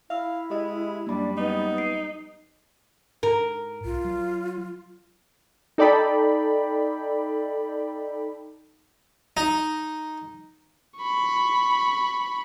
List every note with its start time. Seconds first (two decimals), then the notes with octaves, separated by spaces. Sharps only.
0.10 E4 E5 F5 E6
0.50 G#3 G4 D#5
1.07 F#2 G3 A#3 D4 B5
1.37 B3 D#4
1.78 C7 D7
3.23 G#2 A#4
3.85 B1 F4
4.05 F#3
5.78 D#4 A4 D5 G5 B5
9.37 D#4
10.99 B5 C#6